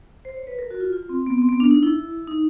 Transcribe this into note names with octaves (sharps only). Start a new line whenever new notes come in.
C5
C#5
B4
A#4
F#4
F4
F4
C4
B3
C4
B3
D4
D#4
E4
D#4